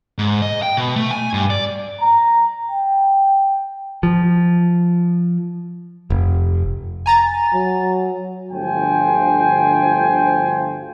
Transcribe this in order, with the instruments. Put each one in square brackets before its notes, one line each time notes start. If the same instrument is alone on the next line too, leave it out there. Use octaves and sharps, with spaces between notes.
[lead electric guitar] G#2
D#5
G5
B2
A3
G#5
G2
D5
[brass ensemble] A#5
G5
[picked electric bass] F3
F1
[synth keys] G#5 A#5 A6
[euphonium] F#3
[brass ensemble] G1 D2 F3 C5 G5 G#5